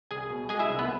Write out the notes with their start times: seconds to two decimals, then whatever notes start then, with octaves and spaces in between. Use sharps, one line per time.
0.11 C2 G#4 G#5
0.30 B2
0.49 G#3 G#4 G#5
0.59 E4 E5
0.69 C2
0.79 B3 B4